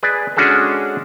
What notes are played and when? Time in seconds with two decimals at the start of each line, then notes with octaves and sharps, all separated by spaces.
0.03 G#4 B4 D5
0.36 G#3 C#4 D4 F#4 G#4 A4